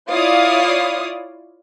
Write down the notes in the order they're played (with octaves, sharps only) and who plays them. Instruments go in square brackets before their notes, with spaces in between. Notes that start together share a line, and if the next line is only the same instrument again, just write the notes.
[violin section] E4 F4 C#5 D5 F5 D#6